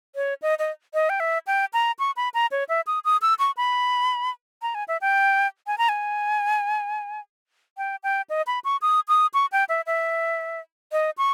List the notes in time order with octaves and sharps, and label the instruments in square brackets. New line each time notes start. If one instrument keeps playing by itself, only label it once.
[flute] C#5
D#5
D#5
D#5
G5
E5
G5
A#5
C#6
B5
A#5
C#5
E5
D#6
D#6
E6
C#6
B5
A#5
G#5
E5
G5
G#5
A#5
G#5
G5
G5
D#5
B5
C#6
D#6
D#6
C#6
G5
E5
E5
D#5
C#6